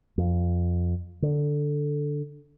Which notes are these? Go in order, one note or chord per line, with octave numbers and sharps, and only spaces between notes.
F2
D3